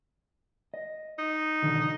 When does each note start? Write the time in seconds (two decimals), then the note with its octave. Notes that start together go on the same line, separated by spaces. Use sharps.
0.74 D#5
1.19 D#4
1.62 B1 D3 D#3